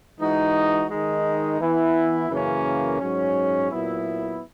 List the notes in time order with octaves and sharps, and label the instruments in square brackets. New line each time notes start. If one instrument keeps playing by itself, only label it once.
[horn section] E3 G#3 D#4 F#4
D#3 G#3 D#4
E3 B3 E4
F#2 C#3 E3 A#3 C#4
G#2 F#3 C#4
A#2 F#3 B3 E4